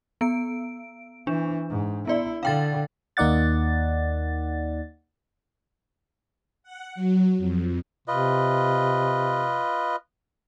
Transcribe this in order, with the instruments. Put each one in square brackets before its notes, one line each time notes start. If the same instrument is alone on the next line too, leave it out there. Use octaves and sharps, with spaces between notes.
[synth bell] B3 D7
[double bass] E3 [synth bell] D4
[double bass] G#2
[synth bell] B3 D5 [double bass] E4
[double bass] D3 [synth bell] F5 G5 A6
[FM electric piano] D#2 A#3 D#4 D5 F#5 A6
[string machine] F#5
F#3
F2
[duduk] C3 [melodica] F4 B4 D#5